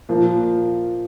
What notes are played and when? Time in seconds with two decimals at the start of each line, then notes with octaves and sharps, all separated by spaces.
0.09 A#2 F3 A#3